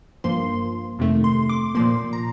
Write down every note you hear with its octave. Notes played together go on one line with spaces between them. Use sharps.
G2 F3 A#3 C6
F2 C3 D#3 A3
C6
D6
A#2 F3 A#3 C6
A#5